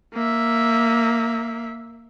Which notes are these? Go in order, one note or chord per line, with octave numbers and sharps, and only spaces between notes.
A#3 E5